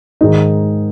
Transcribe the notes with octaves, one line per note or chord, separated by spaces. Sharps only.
G#2 D#3 G#3 D#4